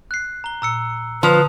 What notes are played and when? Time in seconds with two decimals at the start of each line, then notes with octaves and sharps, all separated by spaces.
0.11 F#6 C7
0.44 A#5 G7
0.62 A#2 A#5 E6 C#7
1.23 D3 F3 B4 A5 D#6 F7